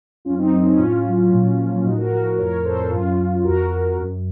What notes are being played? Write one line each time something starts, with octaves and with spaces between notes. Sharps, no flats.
F#2 C#4 F4
C4 D#4
F#2 C4
C#4
A2 C#4 F4
F#3
A#2
F3
A2 D#4 F#4
F#4 A#4
F3 F#4 A#4
F2 A#4 C#5
F2 A4 C5
F#2 C#4 F4
F#2
F2 F#4 A#4
F2
F#2